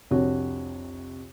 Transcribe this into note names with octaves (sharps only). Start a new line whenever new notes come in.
C2 F2 C3 D4 F#4 C#5